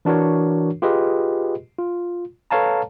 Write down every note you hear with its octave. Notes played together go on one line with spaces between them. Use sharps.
E3 D4 F#4 A#4 C#5
F4 G4 G#4 B4 D#5
F4
A4 B4 C#5 F5 A5 A#5